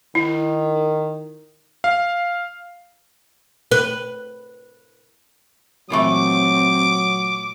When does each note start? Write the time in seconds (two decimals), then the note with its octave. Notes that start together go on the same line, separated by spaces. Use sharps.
0.15 D#3 E4
1.84 F5
3.71 B4
5.90 A#2 E3 F#3 A3 C4 D6